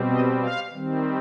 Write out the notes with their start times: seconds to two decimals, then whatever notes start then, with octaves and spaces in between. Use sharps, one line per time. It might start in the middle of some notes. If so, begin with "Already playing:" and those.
Already playing: B2 G3 C4
0.10 D#5
0.41 F5
0.72 D#3 G3 C4